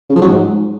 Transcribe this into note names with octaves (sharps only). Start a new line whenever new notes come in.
C#3
F3
F#3
G#2